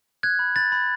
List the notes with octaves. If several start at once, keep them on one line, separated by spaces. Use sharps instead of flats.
F#6 G#6
B5
B5 A6
B5